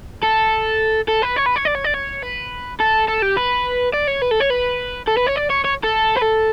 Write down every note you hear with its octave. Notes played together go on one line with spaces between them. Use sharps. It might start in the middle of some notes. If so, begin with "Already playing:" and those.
A4
A4
B4
C#5
B4
C#5
D5
C#5
D5
C#5
B4
A4
A4
G4
B4
D5
C#5
B4
A4
C#5
B4
A4
B4
C#5
D5
C#5
C#5
A4
B4
A4